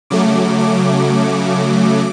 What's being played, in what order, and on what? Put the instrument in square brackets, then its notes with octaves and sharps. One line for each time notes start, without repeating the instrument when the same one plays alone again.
[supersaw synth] C#3 F#3 A3 D6
D6